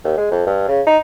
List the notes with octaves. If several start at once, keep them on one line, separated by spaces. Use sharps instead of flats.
D#2
G#3
F2
G2
C#3
D#4